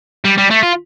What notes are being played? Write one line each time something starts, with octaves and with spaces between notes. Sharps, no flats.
G3
G3
A3
F4